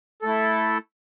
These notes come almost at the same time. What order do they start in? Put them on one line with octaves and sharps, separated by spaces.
A4 A3 E4